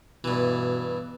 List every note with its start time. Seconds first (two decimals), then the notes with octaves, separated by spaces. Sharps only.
0.24 G2 B2 E3